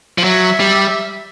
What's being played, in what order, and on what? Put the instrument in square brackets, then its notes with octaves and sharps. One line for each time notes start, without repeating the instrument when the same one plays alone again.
[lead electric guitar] F3
[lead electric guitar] F#3 [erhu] E5
[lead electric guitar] G3